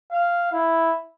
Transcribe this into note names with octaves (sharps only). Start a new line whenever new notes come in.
F5
E4